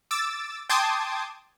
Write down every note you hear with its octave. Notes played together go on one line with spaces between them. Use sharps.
D6 E6 A6
G5 A5 C6 D6 D#6 G#6